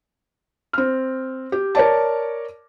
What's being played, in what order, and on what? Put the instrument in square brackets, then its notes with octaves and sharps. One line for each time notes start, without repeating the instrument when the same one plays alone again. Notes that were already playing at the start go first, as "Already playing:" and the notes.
[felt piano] C4 F6
G4
A#4 C#5 D5 A5